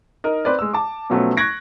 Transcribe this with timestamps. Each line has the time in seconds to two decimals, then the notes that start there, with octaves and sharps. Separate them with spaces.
0.24 D#4 A#4 D#5
0.45 C4 B4 D5
0.59 G#3 E6
0.73 A5 D6
1.10 B2 F3 F#3 A3 B3 C#4
1.37 C#6 F#6 G#6 A#6 D7